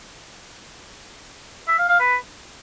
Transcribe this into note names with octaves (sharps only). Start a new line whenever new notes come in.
E5
F5
F5
B4